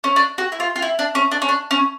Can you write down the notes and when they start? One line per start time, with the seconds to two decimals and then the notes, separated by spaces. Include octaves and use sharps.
0.04 C#4
0.16 D4
0.38 F#4
0.52 E4
0.60 F4
0.76 F4
0.82 E4
0.99 D4
1.15 C#4
1.31 D4
1.42 C#4
1.49 D4
1.71 C#4